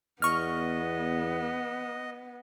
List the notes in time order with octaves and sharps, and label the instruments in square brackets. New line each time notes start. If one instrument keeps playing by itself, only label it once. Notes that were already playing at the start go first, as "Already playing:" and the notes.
[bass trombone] E2 [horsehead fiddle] B3 [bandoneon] D#5 [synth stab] C#6 F6